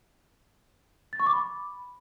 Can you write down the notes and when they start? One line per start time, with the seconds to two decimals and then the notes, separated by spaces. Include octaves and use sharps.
1.13 A6
1.20 C#6
1.26 D6
1.33 B5